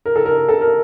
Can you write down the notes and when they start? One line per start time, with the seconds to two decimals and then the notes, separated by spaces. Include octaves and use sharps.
0.06 A#4
0.16 A4
0.26 A#4
0.49 A4
0.61 A#4